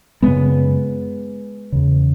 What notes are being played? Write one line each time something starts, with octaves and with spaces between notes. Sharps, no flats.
F#2 C#3 G#3 B3
E2 C#3